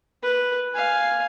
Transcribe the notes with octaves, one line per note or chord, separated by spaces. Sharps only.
B4
F5 G#5